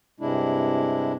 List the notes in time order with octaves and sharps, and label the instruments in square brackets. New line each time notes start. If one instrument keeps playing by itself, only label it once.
[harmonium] G2 C3 G#3 D4 E4